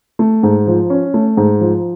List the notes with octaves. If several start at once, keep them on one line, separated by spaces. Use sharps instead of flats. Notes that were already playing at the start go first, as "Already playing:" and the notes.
A3
G#2
F3
C#4
A3
G#2
F3